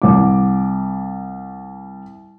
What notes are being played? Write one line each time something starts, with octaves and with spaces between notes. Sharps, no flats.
C2 D6